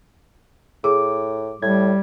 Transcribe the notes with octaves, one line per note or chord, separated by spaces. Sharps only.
A2 G#4 D6
A2 G3 G#6